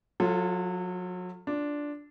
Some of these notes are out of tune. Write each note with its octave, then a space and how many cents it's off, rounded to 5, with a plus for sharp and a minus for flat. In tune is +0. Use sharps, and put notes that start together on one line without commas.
F#3 -35 F4 +0 A4 +0
D4 -5 F4 +10